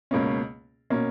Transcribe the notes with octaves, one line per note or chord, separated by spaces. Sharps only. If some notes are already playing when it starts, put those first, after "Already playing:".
C#2 B2 A#3 C#4
B2 A#3 C#4